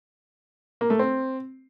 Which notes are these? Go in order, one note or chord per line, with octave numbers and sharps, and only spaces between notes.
A#3
A3
C4